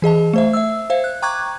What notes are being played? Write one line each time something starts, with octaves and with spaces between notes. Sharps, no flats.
E3 G#4 D#5 A5
A3 C5 E5
E5 E6
C5 E5 F5
F#6
G5 A#5 C#6 D6 F#6 G#6